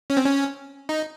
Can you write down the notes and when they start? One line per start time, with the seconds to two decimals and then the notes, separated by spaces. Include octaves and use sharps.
0.10 C#4
0.17 C4
0.25 C#4
0.89 D#4